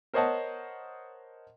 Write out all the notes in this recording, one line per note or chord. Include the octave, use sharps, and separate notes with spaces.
A#4 C5 C#5 D#5 F#5 A5